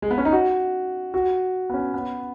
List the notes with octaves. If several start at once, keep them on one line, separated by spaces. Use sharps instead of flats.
G#3
B3
C#4
D#4
F#4
F#4
B3
C#4
B3